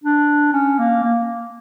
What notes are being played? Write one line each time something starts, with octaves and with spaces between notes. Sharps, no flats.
D4
C#4
A#3
A#3